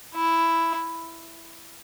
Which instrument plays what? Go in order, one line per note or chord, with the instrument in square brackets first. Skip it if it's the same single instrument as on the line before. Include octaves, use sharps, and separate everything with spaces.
[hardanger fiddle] E4